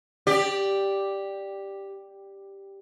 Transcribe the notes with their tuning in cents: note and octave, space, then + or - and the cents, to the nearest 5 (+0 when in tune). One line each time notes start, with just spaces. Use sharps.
G4 +0 D5 +0